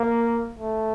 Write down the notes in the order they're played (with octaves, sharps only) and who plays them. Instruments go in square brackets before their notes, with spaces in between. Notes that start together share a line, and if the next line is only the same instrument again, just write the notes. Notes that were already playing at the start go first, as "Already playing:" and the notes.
Already playing: [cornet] A#3
A3